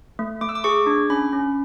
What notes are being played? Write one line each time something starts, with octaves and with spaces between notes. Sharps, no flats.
A3
A3 D6
E6
D6
G#4 C#6
D4
C#4 B5
C#4